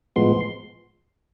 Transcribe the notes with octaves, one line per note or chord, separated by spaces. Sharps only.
A2 F3 G#3 B3 C6